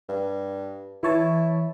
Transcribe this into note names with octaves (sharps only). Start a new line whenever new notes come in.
G2
E3 E4 C#5 A5